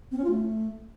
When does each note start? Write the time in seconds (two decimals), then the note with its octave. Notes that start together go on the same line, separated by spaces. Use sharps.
0.11 C4
0.18 C#4
0.24 F4
0.30 A3